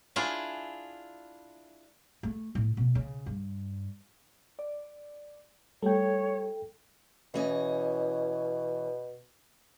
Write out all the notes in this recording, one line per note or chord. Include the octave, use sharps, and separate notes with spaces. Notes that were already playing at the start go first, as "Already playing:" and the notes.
D4 E4 F4 G#4
A3
A2
B2
C#3
G2
D5
G3 A3 A4 C#5 G5
B2 E3 C#4 D#5